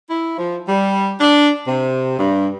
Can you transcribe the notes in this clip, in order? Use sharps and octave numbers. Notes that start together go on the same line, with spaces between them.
E4
F3
G3
D4
C3
G2